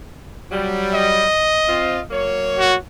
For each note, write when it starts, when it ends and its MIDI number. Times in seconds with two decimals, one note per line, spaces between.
0.51 1.25 54
0.51 1.25 55
0.94 2.04 75
1.68 2.00 60
1.68 2.00 65
2.11 2.76 54
2.11 2.76 58
2.11 2.76 73
2.59 2.77 66